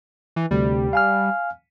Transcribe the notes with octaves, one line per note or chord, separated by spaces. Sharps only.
E3
D2 C3 G3
F5 G#5 F6